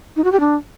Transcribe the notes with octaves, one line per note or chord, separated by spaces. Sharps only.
D#4
F#4
G4
D4